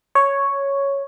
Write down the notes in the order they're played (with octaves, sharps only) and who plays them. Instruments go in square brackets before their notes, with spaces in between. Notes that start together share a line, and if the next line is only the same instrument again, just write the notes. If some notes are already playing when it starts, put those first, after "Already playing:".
[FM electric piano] C#5